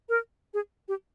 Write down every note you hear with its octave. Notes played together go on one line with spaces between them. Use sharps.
A#4
G#4
G4